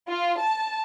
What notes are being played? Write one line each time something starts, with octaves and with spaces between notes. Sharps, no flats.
F4
A5